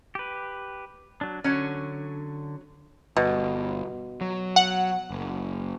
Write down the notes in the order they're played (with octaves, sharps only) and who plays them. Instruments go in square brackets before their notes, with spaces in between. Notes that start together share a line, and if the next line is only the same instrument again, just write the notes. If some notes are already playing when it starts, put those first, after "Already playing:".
[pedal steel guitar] G4 B4
F#3 D4
[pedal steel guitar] D3 [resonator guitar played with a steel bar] F#3 C#4
[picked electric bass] G1 [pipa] B2
[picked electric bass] F#3
[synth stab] F#5
[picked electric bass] F#1